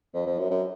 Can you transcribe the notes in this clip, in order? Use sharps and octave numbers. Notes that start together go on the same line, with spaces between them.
F2
F2
F#2
F#2